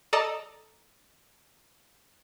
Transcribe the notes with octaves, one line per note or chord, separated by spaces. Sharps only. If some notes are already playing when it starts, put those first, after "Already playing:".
A4 D5 D#5 A5 A#5 D#6